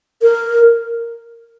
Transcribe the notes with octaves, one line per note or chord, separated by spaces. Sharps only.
A#4